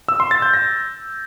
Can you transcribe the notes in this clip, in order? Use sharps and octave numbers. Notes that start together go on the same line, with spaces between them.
E6
C6
A6
G6
A#6